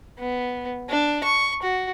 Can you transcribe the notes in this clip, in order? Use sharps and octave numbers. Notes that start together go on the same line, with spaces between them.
B3
D4
C#6
F#4